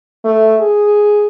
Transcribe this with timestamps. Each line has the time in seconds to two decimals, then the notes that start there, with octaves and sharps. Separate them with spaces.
0.25 A3
0.61 G#4